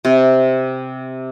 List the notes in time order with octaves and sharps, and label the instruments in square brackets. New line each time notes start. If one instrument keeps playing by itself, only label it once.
[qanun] C3